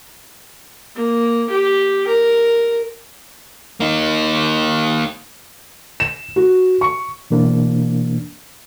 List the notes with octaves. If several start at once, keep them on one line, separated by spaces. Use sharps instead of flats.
A#3
G4
A#4
A#3 D#4
E7
F#4
C#6
B2 E3 A#3 D4